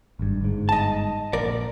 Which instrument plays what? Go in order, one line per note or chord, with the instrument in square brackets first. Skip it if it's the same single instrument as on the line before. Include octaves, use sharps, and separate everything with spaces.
[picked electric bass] G#1 G2
G1 G#2
[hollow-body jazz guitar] D#5 A5
[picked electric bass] A#1 [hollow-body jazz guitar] A#4 D5